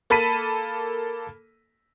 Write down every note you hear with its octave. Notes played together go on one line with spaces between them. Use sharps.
A#3 A4 B5 B6 D#7